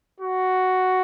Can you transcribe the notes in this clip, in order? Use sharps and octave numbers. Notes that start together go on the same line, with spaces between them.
F#4